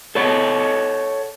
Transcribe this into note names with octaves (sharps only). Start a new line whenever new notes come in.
A4 C#5 F#5